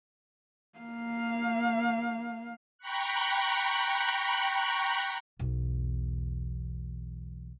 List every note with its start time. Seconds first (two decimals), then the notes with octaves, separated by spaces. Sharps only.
0.79 A#3 F5
2.78 G5 A#5 B5 C#6 F#6
5.39 B1 E2